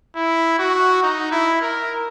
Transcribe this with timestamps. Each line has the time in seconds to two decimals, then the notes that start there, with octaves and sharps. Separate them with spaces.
0.16 E4
0.59 F#4
1.03 D#4
1.32 E4
1.62 A#4